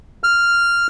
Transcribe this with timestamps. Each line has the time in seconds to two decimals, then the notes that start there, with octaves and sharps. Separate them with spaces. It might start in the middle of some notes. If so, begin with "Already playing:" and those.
0.24 F6